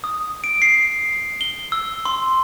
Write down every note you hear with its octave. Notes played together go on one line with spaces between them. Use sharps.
D#6
D7
C7
G7
E6
C6